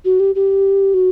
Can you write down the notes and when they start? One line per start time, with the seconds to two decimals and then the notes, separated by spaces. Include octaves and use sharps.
0.05 F#4
0.20 G4
0.35 G4
0.94 F#4